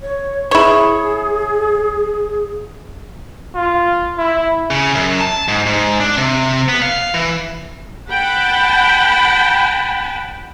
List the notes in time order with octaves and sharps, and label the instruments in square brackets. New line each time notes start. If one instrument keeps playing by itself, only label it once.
[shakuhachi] C#5
[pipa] E4 C#5 [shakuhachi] G#4
[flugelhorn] F4
E4
[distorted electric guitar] C#3
F#2
A5
G#2
G#2
D4
C3
B3
F5
E3
[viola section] F#5 G5 A5 B5